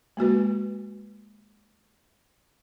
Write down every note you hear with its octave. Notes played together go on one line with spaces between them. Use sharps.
G#3 A#3 F#4 B4